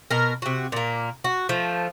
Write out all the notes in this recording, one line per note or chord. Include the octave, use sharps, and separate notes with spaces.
B2 A#4
C3 F#4
A#2 A#3
F#4
F3 A3